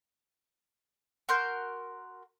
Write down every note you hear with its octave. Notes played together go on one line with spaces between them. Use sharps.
F#4 A#4 C6 G6